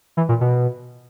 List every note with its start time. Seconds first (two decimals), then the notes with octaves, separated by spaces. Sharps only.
0.17 E3
0.29 A#2
0.41 B2